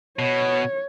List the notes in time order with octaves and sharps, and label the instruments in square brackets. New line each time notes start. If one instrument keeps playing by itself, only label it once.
[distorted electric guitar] B2 [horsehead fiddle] C#5